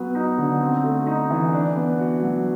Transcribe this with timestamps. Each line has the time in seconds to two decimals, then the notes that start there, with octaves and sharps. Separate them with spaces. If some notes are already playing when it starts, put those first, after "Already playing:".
Already playing: F#3 B3
0.15 D#4
0.38 D3
0.60 C4
0.84 A3
1.06 D#4
1.30 E3
1.53 D4
1.76 B3
1.99 F#4
2.22 F#3